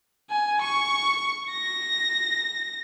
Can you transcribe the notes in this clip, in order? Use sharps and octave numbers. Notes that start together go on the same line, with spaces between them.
G#5
C#6
A#6